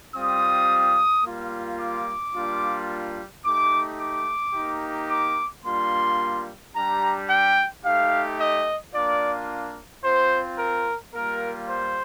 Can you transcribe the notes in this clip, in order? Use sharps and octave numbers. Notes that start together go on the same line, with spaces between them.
G3 C4 F4 D#6
G3 A#3 F4
D6
G3 A#3 D4 F4
A3 D#4 G4 D6
D6
A#3 D#4 G4
D6
G3 A#3 D4 F4 C6
G3 D4 G4 A#5
G5
A3 D#4 G4 F5
D#5
A#3 D4 F4 D5
C4 F4 C5
A#4
G3 A#3 F4 A#4
C5